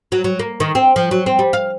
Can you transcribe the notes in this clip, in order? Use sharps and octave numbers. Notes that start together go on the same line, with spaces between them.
F#3
F#3
A#3
D#3
C4
F3
F#3
C4
G3
F5